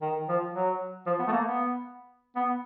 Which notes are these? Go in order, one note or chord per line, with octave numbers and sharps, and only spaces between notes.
D#3
F3
F#3
F3
B3
A3
A#3
B3
B3